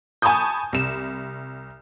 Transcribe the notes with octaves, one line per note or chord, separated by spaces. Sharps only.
G#5 A5 B5 C#6 D#6 G6
C2 E7